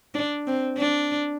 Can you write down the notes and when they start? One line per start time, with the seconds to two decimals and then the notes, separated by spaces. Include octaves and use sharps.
0.14 D4
0.47 C4
0.78 D4